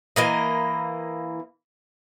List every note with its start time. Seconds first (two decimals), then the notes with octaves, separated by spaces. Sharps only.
0.16 E3 A#3 D#5